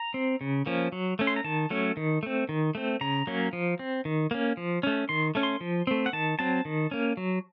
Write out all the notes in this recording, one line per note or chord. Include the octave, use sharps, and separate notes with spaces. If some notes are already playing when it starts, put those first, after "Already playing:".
Already playing: A#5
C4
C#3
F3 A#3 C#4
F#3
A3 C#4
C6
A#5
D#3 A5
F#3 A3 C#4
D#3
A3 C4
D#3
A3 C4
C#3 A#5
F#3 A#3 C#4
F3
C4
D#3
A#3 C#4
F3
A3 C#4
D#3 C6
A3 C#4
C6
F3
A3 C4
F#5
D#3 A5
F#3 C4 A5
D#3
A#3 C#4
F#3